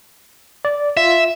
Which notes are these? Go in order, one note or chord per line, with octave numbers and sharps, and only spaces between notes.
D5
F4 E5